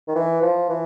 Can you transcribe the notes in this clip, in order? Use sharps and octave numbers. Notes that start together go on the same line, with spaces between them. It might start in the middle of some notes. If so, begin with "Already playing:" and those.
D#3
E3
F3
E3